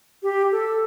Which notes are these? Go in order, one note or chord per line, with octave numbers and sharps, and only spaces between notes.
G4
A4